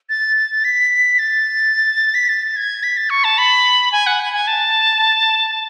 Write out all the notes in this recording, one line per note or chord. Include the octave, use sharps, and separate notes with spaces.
A6
B6
A6
B6
A6
G#6
B6
A6
C#6
A5
B5
G#5
F#5
G#5
G#5
A5